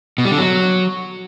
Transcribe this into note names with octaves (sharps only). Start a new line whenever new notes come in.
B2
G3
D3
F#3